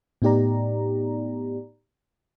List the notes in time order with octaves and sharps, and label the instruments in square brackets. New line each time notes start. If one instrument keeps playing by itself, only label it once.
[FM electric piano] A2 B3 D#4 G4 D5 A#5